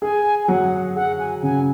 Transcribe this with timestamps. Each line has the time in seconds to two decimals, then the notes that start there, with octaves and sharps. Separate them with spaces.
0.02 G#4 G#5
0.44 G#5
0.48 F#3 F#5
0.96 G#4 F#5
1.19 G#5
1.43 C#3 G#5